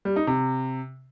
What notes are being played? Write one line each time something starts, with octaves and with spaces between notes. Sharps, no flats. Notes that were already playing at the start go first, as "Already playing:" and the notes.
G3
D#4
C3